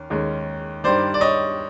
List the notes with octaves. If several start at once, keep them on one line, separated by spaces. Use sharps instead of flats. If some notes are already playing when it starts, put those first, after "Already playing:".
Already playing: D#2 C#4
D#2 D#3 G#3 C#4
G2 D#3 G3 C5 D5
D5
C#5 D#5